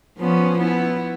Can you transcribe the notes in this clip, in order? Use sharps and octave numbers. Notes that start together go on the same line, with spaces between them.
F3 B3 C#4
B3 E4